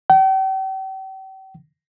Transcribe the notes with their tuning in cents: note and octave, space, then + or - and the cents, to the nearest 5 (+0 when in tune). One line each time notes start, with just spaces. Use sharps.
G5 -40